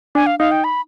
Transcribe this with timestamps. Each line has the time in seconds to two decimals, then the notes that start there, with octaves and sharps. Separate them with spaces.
0.15 D4 G#5
0.26 F5
0.39 D#4 F5
0.51 G5
0.64 B5